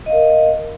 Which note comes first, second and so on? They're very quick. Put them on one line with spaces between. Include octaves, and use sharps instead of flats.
D#5 F5 A#4